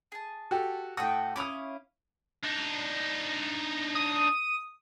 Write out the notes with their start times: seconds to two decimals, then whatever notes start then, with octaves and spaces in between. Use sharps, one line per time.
0.12 G#4 A5
0.51 F#4 G4 A4
0.97 A2 F#4 A4 G5 D#6
1.36 C#4 E4 F5 D6 D#6
2.44 D4 D#4
3.95 D#6